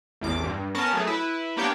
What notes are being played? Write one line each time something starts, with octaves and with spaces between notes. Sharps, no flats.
A1 E2 D6
G2
B3 C#4 A#4 A5
F#3 A3 G#4
E4 B4
A#3 B3 D4 G4 C#5 G5